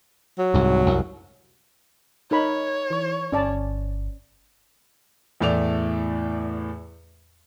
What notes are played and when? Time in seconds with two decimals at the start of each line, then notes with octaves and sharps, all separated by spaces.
0.39 F#3
0.54 C2 G#2
0.86 C2 F#2 C3
2.31 D#4 A#4 C#5 B5
2.90 E3 C#6
3.32 G1 C#4 D5 A5
5.41 E2 A2 A3 D5 F7